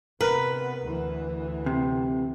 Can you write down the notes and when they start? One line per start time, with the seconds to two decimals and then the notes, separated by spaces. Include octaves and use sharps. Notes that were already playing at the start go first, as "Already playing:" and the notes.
0.21 C3 B3 A#4 B4
0.84 D2 E3
1.66 C3